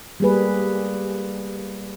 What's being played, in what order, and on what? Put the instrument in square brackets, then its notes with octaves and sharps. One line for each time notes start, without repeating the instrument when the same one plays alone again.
[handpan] G3 A#3 G#4 B4